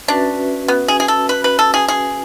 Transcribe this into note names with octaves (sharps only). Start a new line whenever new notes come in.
C#4 D4 F#4 B4 E5
B3
G#4
G#4
A4
B4
B4
A4
G#4
G#4